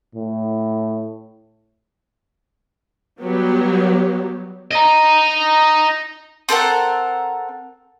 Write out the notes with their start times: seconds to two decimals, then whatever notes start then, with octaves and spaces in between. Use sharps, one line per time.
0.15 A2
3.21 F#3 G3 B3 G4
4.71 D#5 A#5
6.49 C4 A4 A#4 F#5